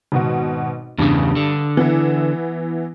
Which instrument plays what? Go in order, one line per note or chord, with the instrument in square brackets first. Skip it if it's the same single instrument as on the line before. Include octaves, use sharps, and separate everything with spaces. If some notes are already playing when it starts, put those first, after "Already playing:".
[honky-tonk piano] G#1 B2 F#4
[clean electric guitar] E2 C#3 [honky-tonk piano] G2 D#6
[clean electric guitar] D3
[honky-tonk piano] E3 B3 E4